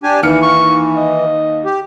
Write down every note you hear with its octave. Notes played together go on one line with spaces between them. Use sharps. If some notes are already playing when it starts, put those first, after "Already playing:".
D4 G4 G#5
D#2 E3 F6 C#7
C#6
D#5
G4